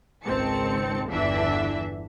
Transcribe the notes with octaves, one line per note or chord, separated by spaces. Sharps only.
G#1 C#2 D#3 C4 A5 C#7
G1 E2 D3 E3 D4 E5